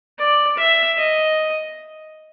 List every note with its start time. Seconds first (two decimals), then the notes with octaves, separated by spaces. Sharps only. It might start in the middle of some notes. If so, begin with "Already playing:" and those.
0.19 D5
0.57 E5
0.97 D#5